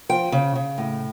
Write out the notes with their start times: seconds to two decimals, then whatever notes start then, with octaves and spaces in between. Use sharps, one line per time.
0.09 F3 G5
0.32 C#3
0.55 C#3
0.78 A2